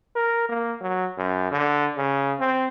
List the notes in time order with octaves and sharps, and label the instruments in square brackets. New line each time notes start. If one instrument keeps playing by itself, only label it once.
[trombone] A#4
A#3
F#3
F#2
D3
C#3
C4